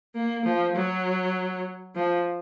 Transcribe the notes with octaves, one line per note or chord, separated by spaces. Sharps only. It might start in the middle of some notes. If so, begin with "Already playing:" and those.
A#3
F3
F#3
F3